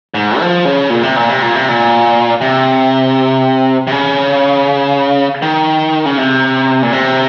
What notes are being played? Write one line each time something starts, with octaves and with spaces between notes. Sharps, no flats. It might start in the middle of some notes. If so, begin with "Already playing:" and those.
G#2
F3
C#3
A#2
C3
A#2
C3
A#2
C3
A#2
C3
C3
C#3
D#3
C#3
C3
A#2
C3